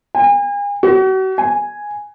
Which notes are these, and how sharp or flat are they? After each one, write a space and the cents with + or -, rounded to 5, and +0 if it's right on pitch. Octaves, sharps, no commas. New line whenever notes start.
G#5 -40
F#4 +40
G#5 -5